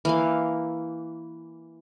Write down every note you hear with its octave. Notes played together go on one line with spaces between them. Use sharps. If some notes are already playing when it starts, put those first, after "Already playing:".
E3 A#3 F5